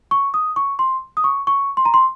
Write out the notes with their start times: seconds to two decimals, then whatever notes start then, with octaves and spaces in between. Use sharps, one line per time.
0.11 C#6
0.34 D#6
0.56 C#6
0.79 C6
1.17 D#6
1.24 C#6
1.47 C#6
1.77 C6
1.85 A#5
1.94 C6